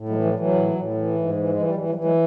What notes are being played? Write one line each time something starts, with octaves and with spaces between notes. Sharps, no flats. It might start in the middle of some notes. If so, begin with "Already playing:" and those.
Already playing: A2
F#3 G#3
E3
F3 G3
E3
F#3
A2
A2
E3
G#2
E3
G#3
E3
G3
E3 F#3
F3 G3
E3
F#3 G#3